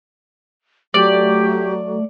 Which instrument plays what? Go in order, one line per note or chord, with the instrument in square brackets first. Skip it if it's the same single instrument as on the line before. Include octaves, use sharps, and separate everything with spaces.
[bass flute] F#3 [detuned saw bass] A3 [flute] G4 [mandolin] D5